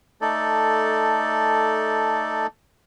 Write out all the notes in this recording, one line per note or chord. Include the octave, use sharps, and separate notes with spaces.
A3 D#4 A4 D5